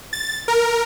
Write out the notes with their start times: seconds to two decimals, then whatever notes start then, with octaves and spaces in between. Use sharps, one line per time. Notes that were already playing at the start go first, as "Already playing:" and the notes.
0.13 A6
0.48 A#4